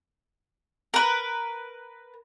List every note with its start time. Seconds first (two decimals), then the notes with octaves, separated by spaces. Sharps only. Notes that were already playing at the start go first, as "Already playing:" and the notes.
0.94 A#4 B4